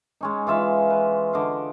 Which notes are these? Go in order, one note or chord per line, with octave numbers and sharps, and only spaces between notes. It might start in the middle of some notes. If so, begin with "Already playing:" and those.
G#3 C#4 D#4
E3 F4 E5 F5
B4
D3 D#5 F5